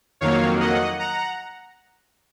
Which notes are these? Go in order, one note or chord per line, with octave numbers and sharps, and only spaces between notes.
F2 D#3 F#3 A#3 C#5 F5
D#5 F#5
F#5 A#5